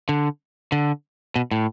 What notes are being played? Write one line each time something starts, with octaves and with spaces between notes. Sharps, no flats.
D3
D3
B2
A2